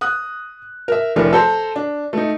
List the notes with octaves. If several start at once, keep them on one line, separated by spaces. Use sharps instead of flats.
D#6 F#6
A#4 E5
F1 A2 A3 D4 A#4
A4 C5 A5 A#5
D4
A3 D#4